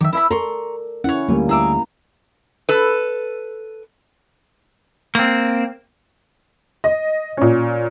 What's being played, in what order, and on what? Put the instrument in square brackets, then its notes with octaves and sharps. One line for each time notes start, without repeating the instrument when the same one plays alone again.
[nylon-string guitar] D#3 [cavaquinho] E5 D6
[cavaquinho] E4 E5 B5 [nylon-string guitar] B4
[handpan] A4 [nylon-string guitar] A#4 D5 [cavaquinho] A#5 C6 C#6
[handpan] C#4 E4 [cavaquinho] C#5 F#5
[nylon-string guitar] D2 G3 G#5 [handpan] A#3
[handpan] E4 [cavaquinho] G#4 E5 D6 [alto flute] A#5
[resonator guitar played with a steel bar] A4 B4
[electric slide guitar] A#3 C4
[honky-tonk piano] D#5
A#2 C#4